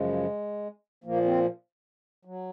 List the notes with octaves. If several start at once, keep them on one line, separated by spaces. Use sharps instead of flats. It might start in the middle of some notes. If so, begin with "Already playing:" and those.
Already playing: F#2 C#3 F3 G#3
A#2 F3 A#3
C4
F#3